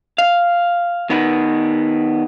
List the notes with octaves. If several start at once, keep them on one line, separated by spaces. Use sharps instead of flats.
F5
D#3 B3 B4